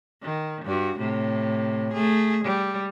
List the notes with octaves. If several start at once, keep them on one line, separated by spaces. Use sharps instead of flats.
D#3
G2 F#4
A2 C3
A3 G#4
G3